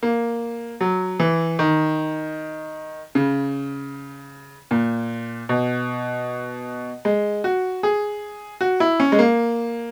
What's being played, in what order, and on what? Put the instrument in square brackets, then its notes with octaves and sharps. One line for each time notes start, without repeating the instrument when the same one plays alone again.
[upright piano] A#3
F#3
E3
D#3
C#3
A#2
B2
G#3
F#4
G#4
F#4
E4
C#4
G#3
A#3